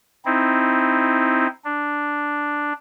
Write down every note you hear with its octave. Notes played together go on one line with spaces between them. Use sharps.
C4 D#4 E4
D4